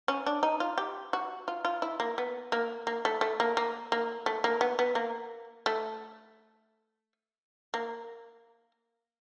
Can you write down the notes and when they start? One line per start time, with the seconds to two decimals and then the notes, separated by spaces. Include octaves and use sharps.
0.08 C#4
0.26 D4
0.43 D#4
0.60 F4
0.78 G4
1.13 F#4
1.48 F4
1.65 F4
1.82 E4
2.00 A#3
2.18 B3
2.52 A#3
2.87 A#3
3.05 A3
3.21 A3
3.40 A#3
3.57 A#3
3.92 A#3
4.26 A3
4.44 A#3
4.61 B3
4.79 B3
4.95 A#3
5.66 A3
7.74 A#3